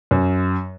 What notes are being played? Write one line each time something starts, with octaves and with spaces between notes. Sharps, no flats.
F#2